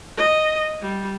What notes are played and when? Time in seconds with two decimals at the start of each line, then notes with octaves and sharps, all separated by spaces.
0.18 D#5
0.82 G3